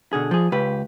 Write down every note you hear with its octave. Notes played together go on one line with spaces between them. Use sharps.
B2 D3 G#4
F3 G#4
C#2 G4 B4